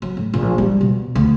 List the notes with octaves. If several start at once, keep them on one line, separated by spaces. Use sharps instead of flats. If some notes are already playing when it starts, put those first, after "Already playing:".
F#3
A2
A#1
G3
B2
D2